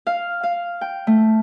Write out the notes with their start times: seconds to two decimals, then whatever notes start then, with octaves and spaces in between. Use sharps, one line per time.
0.07 F5
0.43 F5
0.81 G5
1.07 A3